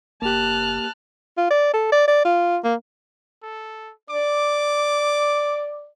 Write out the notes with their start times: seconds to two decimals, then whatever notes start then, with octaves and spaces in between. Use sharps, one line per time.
0.22 F1 A#3 G4 A5 F6 F#6
1.37 F4
1.50 D5
1.73 A4
1.92 D5
2.08 D5
2.25 F4
2.64 A#3
3.43 A4
4.10 D5 D6